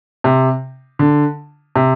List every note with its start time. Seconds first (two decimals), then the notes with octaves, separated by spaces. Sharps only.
0.24 C3
0.99 D3
1.76 C3